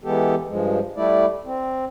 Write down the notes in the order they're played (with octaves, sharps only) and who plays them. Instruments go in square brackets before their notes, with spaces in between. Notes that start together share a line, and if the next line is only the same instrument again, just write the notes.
[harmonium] E3 G#3 B3 G4 A4
G2 F3 G#3
G3 A3 E4 D5
C4